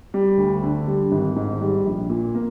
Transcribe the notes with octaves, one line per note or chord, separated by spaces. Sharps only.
G3
D2
D3
G3
G#1
G#2
G3
A#1
A#2
A#3